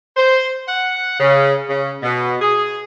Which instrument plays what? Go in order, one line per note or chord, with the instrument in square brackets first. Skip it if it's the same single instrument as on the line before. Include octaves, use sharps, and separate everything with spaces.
[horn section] C5
F#5
C#3
C#3
B2
G#4